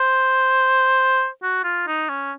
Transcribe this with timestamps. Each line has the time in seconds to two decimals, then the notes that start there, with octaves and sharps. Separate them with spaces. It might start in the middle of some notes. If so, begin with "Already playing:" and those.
Already playing: C5
1.43 F#4
1.64 F4
1.87 D#4
2.09 C#4